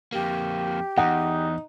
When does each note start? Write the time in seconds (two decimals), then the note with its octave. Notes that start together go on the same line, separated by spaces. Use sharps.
0.12 F2 A#3 G4
0.98 E2 D#4 F#5